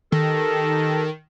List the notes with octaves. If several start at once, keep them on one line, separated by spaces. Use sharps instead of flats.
D#3 D#4 G4 A4